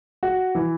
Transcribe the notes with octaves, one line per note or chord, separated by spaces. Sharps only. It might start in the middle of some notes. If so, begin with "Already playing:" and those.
F#4
E3